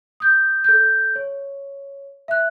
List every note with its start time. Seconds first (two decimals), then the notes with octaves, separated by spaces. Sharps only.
0.20 D#6 G6
0.64 A4 G6
1.16 C#5
2.28 E5 F#6